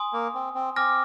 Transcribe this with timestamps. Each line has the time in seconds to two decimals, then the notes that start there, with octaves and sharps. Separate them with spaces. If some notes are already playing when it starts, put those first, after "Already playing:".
Already playing: G#5 C6 D#6
0.13 A#3
0.35 C4
0.55 C4
0.76 C4 G#5 D6 F6 A#6